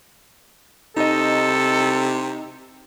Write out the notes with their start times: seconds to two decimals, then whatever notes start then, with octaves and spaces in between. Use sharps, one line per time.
0.96 C3 D#4 A4 D#5